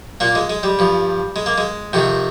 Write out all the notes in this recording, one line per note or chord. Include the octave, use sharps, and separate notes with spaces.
A#2 A#3
G#3
G#3
G3
G2 F3
G#3
A#3
G#3
F2 C3 D#3